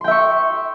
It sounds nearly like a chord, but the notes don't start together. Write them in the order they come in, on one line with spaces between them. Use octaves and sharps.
C6 G5 E5 C#6